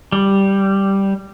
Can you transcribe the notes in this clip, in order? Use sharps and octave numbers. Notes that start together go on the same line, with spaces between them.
G3